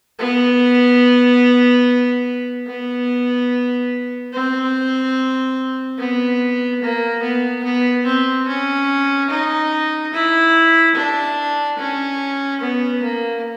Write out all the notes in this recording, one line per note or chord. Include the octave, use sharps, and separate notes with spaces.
B3
B3
C4
B3
A#3
B3
B3
C4
C#4
D#4
E4
D4
C#4
B3
A#3